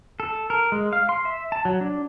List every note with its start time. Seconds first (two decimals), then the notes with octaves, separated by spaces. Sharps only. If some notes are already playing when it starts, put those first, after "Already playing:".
0.20 A4
0.50 A#4
0.72 G#3
0.93 F5
1.09 C6
1.25 E5
1.52 A5
1.65 F#3
1.81 D4